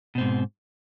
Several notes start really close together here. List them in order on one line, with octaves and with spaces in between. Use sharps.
B2 C4 G#2